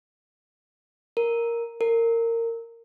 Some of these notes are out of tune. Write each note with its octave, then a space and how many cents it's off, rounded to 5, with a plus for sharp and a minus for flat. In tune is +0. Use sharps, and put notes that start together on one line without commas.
A#4 +0
A#4 -20